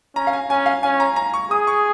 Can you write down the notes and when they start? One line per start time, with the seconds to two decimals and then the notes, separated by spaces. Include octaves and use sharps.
0.16 C#4 A#5
0.27 F5
0.33 G#5
0.50 C#4 G#5
0.66 F5
0.83 C#4 G#5
1.00 A#5
1.16 A#5
1.34 C#6
1.51 G#4 D#6
1.67 C#6